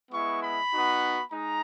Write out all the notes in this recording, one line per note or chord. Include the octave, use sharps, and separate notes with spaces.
G#3 B3 E4 C#6
B5
B3 D#4 F#4
G#3 D#4 A#5